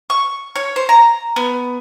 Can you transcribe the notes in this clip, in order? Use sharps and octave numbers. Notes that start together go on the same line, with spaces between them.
C#6
C#5
C5
A#5
B3